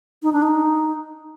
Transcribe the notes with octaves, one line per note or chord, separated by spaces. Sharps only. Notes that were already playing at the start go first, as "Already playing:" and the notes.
D#4
D4
D#4